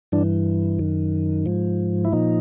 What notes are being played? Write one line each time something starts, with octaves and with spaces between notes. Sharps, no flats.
G2 E3 D4
F#2 D#3
G#2 F3
E4
A#2 F3 D#4